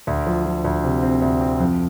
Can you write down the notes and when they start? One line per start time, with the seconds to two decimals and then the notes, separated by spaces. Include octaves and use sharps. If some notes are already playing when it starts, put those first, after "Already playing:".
0.07 D2
0.27 F3
0.46 F3
0.64 D2
0.84 C3
1.03 C4
1.22 D2
1.41 C4
1.60 F2